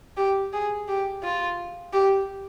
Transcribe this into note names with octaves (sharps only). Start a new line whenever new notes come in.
G4
G#4
G4
F4
G4